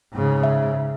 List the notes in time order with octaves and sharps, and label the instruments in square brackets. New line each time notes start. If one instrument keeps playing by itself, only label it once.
[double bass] G#2 C#3
[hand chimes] E5